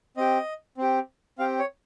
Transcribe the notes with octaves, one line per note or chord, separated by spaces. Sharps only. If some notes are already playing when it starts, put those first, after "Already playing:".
C4 G4 D#5
C4 G4
C4 G4 F5
C#5